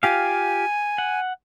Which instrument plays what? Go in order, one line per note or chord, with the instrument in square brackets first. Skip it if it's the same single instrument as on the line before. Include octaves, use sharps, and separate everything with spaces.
[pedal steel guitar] F4 G4 F5 [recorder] G#5
[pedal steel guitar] F#5